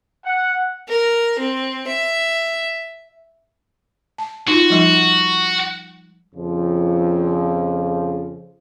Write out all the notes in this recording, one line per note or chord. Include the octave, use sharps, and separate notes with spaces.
F#5
A#4
C4
E5
A5
D#4 F4 F#4
F3 G3 D#4
F2 C#3 F3